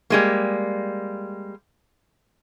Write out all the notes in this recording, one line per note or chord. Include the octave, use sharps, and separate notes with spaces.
G3 G#3 A#3